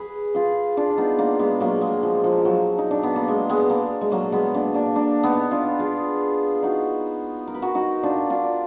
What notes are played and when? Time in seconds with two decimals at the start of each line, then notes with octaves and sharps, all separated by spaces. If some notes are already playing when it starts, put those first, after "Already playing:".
Already playing: G#4 B4
0.35 F4 G#4
0.77 D4 F4
0.97 B3 D#4
1.18 A#3 D4
1.39 G#3 B3
1.60 F#3 A#3
1.81 G#3
2.03 F3
2.24 F3
2.45 F#3
2.78 D#4
2.91 D4
3.03 B3
3.16 A#3
3.28 G#3
3.49 G#3 B3
3.70 A#3 D4
4.01 G#3
4.12 F#3 A#3
4.32 G#3 B3
4.54 A#3 D4
4.74 A#3 D4
4.96 A#3 D4
5.23 B3 D#4
5.51 D4 F4
5.79 F4 G#4
6.63 D#4 F#4
7.48 A#4
7.55 B4
7.62 F#4 A#4
7.75 D#4 F#4
8.03 D4 F4
8.30 D4 F4